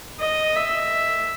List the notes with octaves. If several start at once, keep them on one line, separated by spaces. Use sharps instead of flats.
D#5
E5